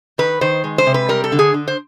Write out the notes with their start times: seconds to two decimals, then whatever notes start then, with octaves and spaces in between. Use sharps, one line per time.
0.18 D#3 B4
0.41 D#3 C5
0.64 G#3
0.78 C5
0.87 C3
0.94 B4
1.09 G3 A#4
1.24 A4
1.32 D3
1.39 G#4
1.54 D3
1.68 C5